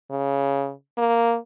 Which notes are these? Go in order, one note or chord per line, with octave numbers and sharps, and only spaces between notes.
C#3
A#3